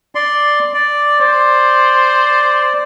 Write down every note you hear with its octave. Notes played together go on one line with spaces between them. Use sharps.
D5 C6
D5
C5 D5